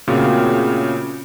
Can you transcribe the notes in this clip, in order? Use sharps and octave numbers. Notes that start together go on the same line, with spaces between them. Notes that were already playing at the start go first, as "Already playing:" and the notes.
A#2 C#3 A3 C4 F#4 A#4 F5